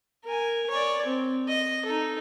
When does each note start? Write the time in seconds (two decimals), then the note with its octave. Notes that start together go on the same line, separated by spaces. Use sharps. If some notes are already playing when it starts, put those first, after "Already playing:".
0.25 A#4 G#5
0.70 C#5 D5
1.05 C4
1.48 D#5
1.85 D#4 A4